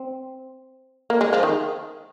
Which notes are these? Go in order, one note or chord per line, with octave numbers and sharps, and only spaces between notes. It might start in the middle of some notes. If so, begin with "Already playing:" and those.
Already playing: C4
A#3
G#3
F3
D#3